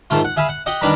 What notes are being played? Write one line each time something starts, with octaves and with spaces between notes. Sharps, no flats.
G#2 D#3 A3 F4
F#5
G#4 E5 F5 G#5 B5
F#5
G4 D#5 F#5
D#3 G3 D4 B4 A#5 B5